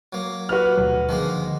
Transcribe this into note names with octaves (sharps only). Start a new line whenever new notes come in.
F#3 A#3
F#4 B4 F6
D2 B2 F#3
D3 D#3 F3 G#3 A#3